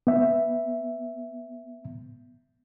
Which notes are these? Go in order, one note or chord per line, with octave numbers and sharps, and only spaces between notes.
B3 E5